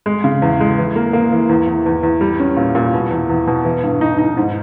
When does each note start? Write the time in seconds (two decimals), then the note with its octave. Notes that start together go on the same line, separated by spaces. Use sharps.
0.06 G#3
0.24 C#3
0.42 E2
0.60 G#3
0.78 E3
0.96 A#3
1.13 A#3
1.32 E3
1.49 E2
1.67 E2
1.86 E2
2.03 E2
2.21 G3
2.40 C#4
2.57 A#2
2.75 A#2
2.94 B2
3.11 E2
3.29 E2
3.47 B2
3.65 E3
3.83 G2
4.01 D#4
4.18 D#4
4.37 G#2